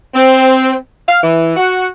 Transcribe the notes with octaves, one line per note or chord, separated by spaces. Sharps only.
C4
F5
E3
F#4